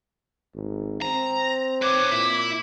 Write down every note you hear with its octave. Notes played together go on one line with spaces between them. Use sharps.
G#1
C4 A#5
B4 C#5 D6
A#2 E4